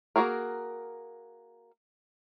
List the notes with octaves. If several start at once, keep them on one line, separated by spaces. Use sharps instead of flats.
A#3 B3 F#4 G#4 A#4